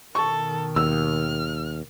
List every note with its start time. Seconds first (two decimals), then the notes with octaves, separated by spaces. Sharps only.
0.15 B2 D#3 A4 C#6
0.76 D#2 E6 F6